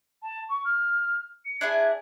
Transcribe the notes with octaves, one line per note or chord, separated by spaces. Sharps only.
A5
C#6
F6
C#7
D4 E4 G#4 G#6